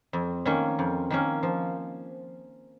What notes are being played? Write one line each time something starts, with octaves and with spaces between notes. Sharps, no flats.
F2
D#3 A#3 C#4
F2
D#3 A#3 C#4
F3